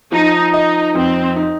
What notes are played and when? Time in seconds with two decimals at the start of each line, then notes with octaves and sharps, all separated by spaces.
0.12 F3 D#4
0.53 D#4 D#5
0.95 F2 C4
1.36 D#4